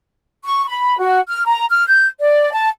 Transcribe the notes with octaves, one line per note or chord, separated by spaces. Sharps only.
C#6
B5
F#4
F6
A#5
F6
G6
D5
A5